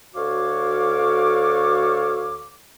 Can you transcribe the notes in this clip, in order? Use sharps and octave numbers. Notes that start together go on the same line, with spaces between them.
D2 F#4 A4 C#5 F5 D6